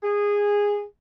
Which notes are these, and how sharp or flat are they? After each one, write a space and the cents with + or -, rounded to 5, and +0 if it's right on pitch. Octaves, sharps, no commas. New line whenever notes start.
G#4 -15